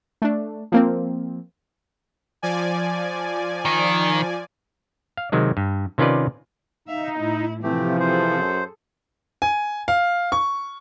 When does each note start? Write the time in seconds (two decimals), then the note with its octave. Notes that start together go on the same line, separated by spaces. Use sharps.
0.22 A3 D4
0.72 F3 A#3 C4
2.42 F3 D5 G#5
3.65 D#3
5.17 F5
5.32 C3 D#3 F#3 G#3
5.57 G2
5.98 C3 D#3 C#4 F4 B4 D5
6.88 D#4 E5 F5
7.19 A2 E4
7.63 C3 E3 F3 A3 C4 G4
8.00 G#4 A4 C5
8.39 F#2
9.42 G#5
9.88 F5
10.32 C#6